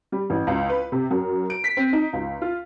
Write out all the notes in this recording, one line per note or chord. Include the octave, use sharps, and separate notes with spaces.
G3
A1
C#2
B4
C3
F#2
D7
B6
C4
D#4
C#2
F4